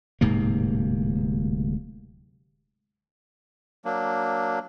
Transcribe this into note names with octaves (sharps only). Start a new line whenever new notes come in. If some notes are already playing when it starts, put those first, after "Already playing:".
D1 G#2 C3 A#3
F#3 A#3 D4